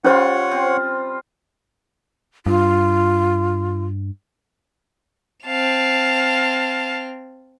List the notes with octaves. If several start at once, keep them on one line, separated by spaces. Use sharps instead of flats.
G3 C#4 F4 C5 C#5 F#5 C6
C4
G2 F4
C4 F5 A5 F7